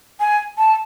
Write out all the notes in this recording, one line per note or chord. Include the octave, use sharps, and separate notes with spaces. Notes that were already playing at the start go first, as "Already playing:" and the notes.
G#5
A5